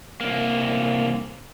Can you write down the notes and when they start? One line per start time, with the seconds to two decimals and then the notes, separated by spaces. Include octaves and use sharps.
0.21 C2 A#3